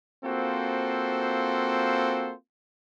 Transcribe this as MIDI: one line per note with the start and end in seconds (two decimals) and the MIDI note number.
0.24 2.33 58
0.24 2.33 60
0.24 2.33 65
0.24 2.33 66
0.24 2.33 69
0.24 2.33 72